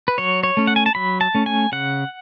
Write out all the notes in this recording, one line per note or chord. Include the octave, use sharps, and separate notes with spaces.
B4
F#3 C#5
C#5
A3 C#4
F#5
G#5
A5
F#3 B5
A5
A3 C#4
G#5
C#3 F#5